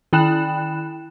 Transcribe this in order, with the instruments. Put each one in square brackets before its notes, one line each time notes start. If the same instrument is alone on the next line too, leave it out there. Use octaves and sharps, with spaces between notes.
[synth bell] D#3 E4 G5 B5 F#6 E7